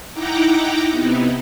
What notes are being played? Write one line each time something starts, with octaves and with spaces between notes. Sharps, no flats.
D#4 E4 F#5 G5 A#5 D6
C3 B3 D#4 E4